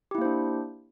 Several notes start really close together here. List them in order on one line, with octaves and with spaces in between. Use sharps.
G4 E4 A#3 C5 D4